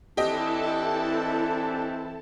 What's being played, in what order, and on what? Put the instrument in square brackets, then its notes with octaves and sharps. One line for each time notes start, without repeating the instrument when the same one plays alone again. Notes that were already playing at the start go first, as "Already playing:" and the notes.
[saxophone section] E3 C4 [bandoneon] D4 [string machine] E4 A4 A5 [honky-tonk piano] G4 D#5